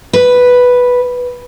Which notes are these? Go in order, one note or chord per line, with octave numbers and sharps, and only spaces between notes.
B4